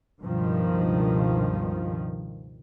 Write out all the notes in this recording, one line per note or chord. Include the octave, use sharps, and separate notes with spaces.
C#2 G2 B2 D#3 F3